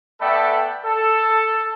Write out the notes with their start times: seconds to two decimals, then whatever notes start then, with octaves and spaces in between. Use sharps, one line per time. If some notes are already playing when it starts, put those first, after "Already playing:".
0.21 A3 B3 A4 D5 G5 B5
0.84 A4